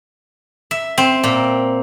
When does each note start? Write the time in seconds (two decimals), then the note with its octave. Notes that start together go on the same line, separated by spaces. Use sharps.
0.71 E5
0.98 C4
1.24 A#2